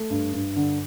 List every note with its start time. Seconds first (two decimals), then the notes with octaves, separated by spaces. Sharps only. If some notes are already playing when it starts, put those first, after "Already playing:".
Already playing: A3
0.10 G2
0.33 G2
0.56 D3